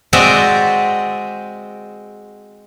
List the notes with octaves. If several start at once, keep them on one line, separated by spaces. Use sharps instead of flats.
G#3 C4 F#4 D5 E5 G5